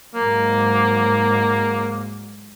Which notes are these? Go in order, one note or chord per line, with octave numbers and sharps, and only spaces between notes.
G#2 F#3 A#3